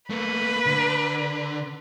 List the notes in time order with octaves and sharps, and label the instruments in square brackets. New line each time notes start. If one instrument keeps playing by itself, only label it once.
[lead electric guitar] A3 A#3 [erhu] B4
[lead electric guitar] D3